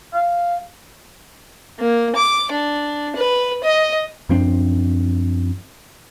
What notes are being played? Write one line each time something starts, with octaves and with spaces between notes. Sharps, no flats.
F5
A#3
D6
D4
B4
D#5
F#2 F3 C4 D4